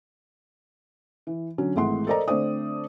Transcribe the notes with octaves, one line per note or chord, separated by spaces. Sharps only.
E3
D3 F#3 C#4
G#1 E3 G#3 A3 F#5 C6
A4 A#4 C5 D5 D#5 A#5
D3 A3 C4 C5 D5 D#6